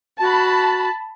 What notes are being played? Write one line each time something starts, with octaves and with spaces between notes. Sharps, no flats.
F#4 A5 B5